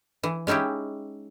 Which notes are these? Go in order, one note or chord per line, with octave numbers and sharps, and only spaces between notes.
E3
G#3 C#4 D#4 E4 G4